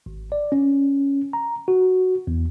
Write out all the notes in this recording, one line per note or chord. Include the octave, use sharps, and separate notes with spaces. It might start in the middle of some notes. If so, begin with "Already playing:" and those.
G#1
D5
C#4
A#5
F#4
E2